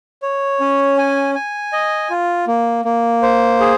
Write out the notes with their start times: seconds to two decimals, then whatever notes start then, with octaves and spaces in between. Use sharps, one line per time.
0.22 C#5
0.60 C#4
0.98 G#5
1.35 G#5
1.73 D#5
2.10 F4
2.47 A#3
2.85 A#3
3.22 C5
3.60 G#4